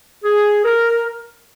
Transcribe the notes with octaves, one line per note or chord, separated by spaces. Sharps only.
G#4
A#4